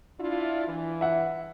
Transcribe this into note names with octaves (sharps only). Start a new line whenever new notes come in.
D4 E4 F4
E3
E5 F#5